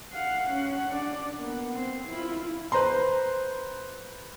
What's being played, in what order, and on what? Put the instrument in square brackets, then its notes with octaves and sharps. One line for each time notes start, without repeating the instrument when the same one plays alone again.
[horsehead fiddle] F5 F#5
C#4 F#5
D4 D5
A#3 B3
C4 C5
E4 F4
[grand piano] B4 C5 A#5 C6